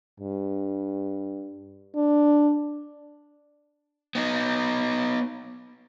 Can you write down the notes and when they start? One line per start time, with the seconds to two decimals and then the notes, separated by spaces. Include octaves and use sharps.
0.20 G2
1.96 D4
4.15 B3 D#4